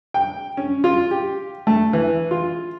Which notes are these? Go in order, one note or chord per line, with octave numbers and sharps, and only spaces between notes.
G5
C#4
F4
G4
A3
E3
F4